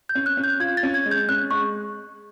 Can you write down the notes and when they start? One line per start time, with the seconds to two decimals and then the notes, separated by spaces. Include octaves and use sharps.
0.09 G6
0.15 C#4
0.26 F#6
0.37 C#4
0.44 G6
0.60 F4 G#6
0.77 A6
0.83 C#4
0.94 G#6
1.06 G#3
1.11 G6
1.29 C#4 F#6
1.51 G#3 C#6